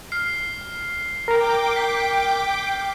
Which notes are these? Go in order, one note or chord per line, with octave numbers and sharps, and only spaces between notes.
F6 C7
A#4 G5 A#5 D6
B6